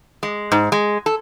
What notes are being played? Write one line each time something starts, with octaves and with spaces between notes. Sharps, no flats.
G#3
G#2
G#3
A4